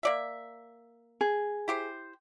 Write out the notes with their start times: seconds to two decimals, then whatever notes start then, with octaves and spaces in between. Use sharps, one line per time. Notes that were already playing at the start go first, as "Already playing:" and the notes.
0.03 A#3 D5 E5
1.21 G#4
1.68 E4 G4 C5